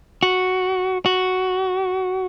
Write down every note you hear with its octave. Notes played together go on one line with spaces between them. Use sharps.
F#4
F#4